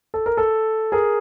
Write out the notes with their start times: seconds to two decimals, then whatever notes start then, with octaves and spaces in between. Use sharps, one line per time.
0.14 A4
0.26 A#4
0.37 A4
0.92 G#4 A#4